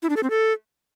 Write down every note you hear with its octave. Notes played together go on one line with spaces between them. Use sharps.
E4
D4
A4
C4
A4